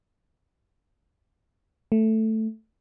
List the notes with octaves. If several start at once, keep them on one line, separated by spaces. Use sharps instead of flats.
A3